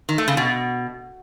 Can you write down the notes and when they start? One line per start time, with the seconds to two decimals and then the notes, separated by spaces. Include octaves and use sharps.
0.09 D#3
0.18 A3
0.28 C#3
0.37 B2